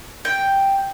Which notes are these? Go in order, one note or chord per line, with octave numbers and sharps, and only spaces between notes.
G5